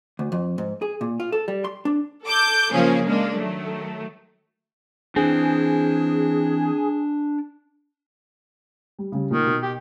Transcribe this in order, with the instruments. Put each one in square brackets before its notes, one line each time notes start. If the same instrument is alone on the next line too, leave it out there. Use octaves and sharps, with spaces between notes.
[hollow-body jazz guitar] D2
F2
G#2
G#4
A#2
F4
A4
G3
C6
D4
[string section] A4 D6 G6
C#3 F3 A#3 C#4 G#4
G#3 A#3 D4
D#3 F#3 A3
[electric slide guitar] E3 C4 [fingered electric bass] D4 [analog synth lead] G#4
[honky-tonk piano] G3
C#3 G3
[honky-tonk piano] A#2 [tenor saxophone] D#3
[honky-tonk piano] B2
[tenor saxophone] G4